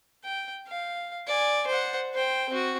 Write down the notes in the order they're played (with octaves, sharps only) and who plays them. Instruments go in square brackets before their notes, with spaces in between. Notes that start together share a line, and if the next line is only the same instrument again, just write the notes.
[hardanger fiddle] G5
F5
D5 G#5
C5 F#5
C5 G5
C4 F#4